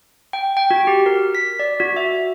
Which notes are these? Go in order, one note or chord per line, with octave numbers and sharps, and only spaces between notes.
G5
G5
F#4
G4
A#4
B6
D5
F#4
E5